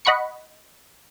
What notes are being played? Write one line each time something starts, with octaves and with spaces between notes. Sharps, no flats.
D#5 F#5 B5 C#6 C#7